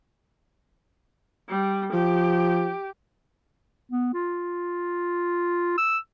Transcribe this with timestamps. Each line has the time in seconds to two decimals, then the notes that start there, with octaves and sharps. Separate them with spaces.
1.49 G3
1.93 F3 G4
3.91 B3
4.14 F4
5.78 E6